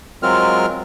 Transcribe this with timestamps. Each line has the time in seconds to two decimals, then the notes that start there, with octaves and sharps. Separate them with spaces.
0.23 F#3 G#3 C4 F4 A#4 F6